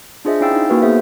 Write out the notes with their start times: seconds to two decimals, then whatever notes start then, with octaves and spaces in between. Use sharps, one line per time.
0.25 D4 F4 G#4 C5 D#5 E5
0.41 C#4 E4 F5 G5 E6 A6
0.52 D#4
0.69 A#3 F#4 A#4 B4
0.82 B3 G#4 C5 E5